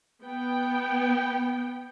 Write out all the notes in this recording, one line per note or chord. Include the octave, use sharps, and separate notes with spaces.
B3 G5